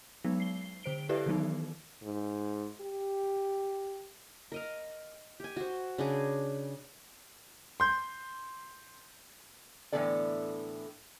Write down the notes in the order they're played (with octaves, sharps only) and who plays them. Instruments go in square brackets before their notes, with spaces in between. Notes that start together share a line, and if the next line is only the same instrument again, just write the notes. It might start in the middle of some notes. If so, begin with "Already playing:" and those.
[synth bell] F#3 G#3 B3 D#4
C7 G7
D3 C5 D7 G7
E4 G4 A4 B4 D5 E5
D#3 E3 F#3 B3 D#4
[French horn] G#2
G4
[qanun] A#4 D#5 F5
G4 G#5
F#4 C5
C#3 D4 G#4 A#5
[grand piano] C6 G6
[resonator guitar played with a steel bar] A2 D3 E3 B3 A4 D5